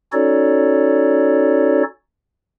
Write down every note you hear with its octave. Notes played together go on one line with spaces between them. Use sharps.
C#4 D#4 F#4 A4 C#5 D5